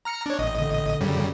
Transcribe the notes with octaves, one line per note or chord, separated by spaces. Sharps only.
A#5 F6 C#7
D4 C#5
A1 D#5
D3
F#2 C#3 G3